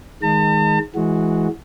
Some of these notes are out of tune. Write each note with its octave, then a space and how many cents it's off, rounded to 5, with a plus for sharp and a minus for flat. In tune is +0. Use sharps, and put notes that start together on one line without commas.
D#3 +5 G#3 -10 A5 +40
E3 +0 G#3 +15 F#4 -10